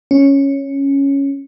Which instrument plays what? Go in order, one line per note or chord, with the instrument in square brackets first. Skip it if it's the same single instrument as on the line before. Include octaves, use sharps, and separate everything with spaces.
[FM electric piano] C#4